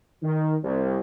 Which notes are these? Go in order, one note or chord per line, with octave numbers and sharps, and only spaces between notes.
D#3
C2